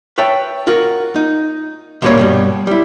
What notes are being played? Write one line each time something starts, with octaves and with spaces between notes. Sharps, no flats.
B4 C#5 E5 G5 A5
F4 F#4 A#4
D#4
D2 A#2 G3 A#3 B4 C#5
G2 B2 G3
G3 E4